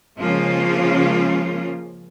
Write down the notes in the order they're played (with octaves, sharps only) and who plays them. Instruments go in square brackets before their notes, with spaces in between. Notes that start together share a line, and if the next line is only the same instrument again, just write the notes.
[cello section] C#3 F3 G#3 A#3 C#4 F4